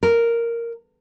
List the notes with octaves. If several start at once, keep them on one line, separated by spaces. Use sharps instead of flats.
A#4